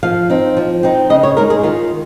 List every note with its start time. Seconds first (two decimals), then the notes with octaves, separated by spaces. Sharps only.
0.03 F3 F5
0.30 C4 D#4
0.57 F3
0.83 C4 D#4
1.10 C#3 D#5
1.23 C#5
1.37 G#3 D#4 A#4
1.50 G#4
1.63 D#3 F4